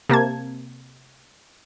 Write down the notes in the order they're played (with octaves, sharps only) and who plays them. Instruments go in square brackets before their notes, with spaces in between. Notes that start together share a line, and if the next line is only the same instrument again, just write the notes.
[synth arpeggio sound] C3 A#3 A5 G#6